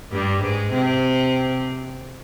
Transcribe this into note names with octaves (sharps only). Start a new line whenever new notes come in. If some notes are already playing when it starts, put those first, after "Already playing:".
G2 G3
G#2 G#3
C3 C4